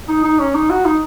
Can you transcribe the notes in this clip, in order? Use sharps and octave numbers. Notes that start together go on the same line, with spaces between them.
D#4
D#4
C#4
D#4
F#4
D#4